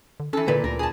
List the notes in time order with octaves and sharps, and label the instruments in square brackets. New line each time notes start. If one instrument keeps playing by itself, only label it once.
[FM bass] D3
[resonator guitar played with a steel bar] E3 A4 [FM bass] C#4
[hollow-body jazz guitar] C2 A#2 B4 [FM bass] D3
[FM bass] D2 [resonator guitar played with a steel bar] A#4
[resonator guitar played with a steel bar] G#4 A5